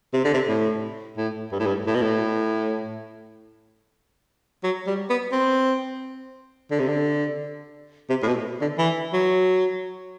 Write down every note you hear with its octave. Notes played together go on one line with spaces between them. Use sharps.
C3
D3
C3
A2
A2
G2
A2
G2
A2
B2
A2
F#3
G3
B3
C4
D3
C3
D3
C3
A2
B2
D3
E3
F#3